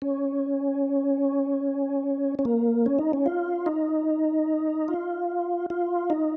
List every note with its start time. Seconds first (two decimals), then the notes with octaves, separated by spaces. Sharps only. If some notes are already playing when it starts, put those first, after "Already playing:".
0.02 C#4
2.39 C#4
2.45 A#3
2.86 C#4
2.99 D#4
3.13 C#4
3.26 F4
3.66 D#4
4.88 F4
5.70 F4
6.10 D#4